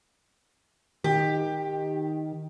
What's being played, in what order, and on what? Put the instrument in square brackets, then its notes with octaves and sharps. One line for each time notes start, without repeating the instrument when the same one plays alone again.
[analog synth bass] D#3 [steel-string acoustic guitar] G4